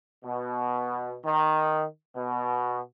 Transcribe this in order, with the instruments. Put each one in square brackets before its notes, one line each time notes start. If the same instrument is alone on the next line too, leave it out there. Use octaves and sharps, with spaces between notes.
[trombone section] B2
D#3
B2